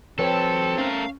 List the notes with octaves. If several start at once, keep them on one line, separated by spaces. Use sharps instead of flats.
F3 C4 F#4 A4 B4 C#5 G5
A3 C#4 A#4 F5